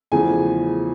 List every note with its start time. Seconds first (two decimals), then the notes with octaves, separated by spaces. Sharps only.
0.12 E2 C#3 F3 A3 G#5